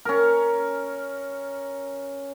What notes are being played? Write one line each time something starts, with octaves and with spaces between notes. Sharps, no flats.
C#4 A#4